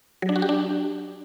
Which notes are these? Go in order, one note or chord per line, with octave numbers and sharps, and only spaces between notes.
F#3
D4
F#4
G4
D4